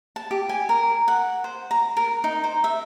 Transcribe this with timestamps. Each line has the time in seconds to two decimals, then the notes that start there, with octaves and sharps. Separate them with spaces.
0.16 A5
0.31 G4
0.49 G#5
0.69 A#4
1.08 F#5
1.44 C5
1.71 A#5
1.97 A#4
2.24 D#4
2.44 C5
2.64 E5